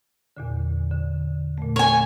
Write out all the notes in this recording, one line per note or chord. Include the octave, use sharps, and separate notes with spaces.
E2 A#2 D3
D3
A#2 A3
C#5 G#5